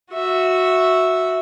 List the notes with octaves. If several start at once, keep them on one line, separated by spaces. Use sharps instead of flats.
F#4 E5